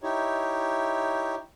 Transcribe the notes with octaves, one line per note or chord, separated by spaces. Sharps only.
D#4 E4 G4 C#5